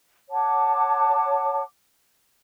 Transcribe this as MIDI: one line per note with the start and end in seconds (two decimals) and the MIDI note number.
0.30 1.62 73
0.30 1.62 78
0.30 1.62 81
0.30 1.62 86